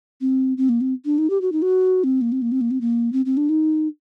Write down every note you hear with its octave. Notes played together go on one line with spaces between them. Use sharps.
C4
C4
A#3
C4
D4
D#4
G4
F#4
D#4
F#4
C4
A#3
C4
A#3
C4
A#3
C4
A#3
C4
C4
D4
D#4